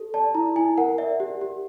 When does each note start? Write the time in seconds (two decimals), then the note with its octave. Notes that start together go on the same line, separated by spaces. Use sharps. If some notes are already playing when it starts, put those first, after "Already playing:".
Already playing: G4 A4
0.14 D5 A5
0.35 E4 A#5
0.56 E4 G#5
0.78 A#4 F#5
0.98 D5 E5
1.20 G4
1.41 G4